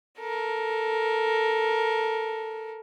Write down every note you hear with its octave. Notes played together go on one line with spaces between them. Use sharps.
A4 A#4